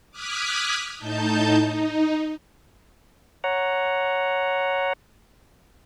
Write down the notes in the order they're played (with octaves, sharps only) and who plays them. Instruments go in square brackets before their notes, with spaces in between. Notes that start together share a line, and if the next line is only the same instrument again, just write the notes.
[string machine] D6 D#6 F6 F#6 G#6 B6
A2 D#4 A5 G6
D#4
[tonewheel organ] C#5 F#5 A#5